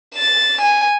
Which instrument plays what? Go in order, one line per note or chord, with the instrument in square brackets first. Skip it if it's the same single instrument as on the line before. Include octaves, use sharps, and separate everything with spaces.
[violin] A6 E7
G#5